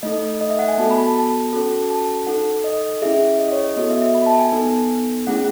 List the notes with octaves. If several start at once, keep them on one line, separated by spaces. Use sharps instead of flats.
A3 D#4 A4 D#5
D#5
E5
F#5
G#5
B3 F#4 A4 A5
B5
A5
A5
C#4 F#4 A4
A5
D#4 A4 F#5
D#5
C#4 E4 G#4 E5
D#5
C#5
D#5
B3 F#4 A4 D#5
E5
E5
B5
A5
G#5
B3 D#4 A4
A3 C#4 E4 G#4 F#5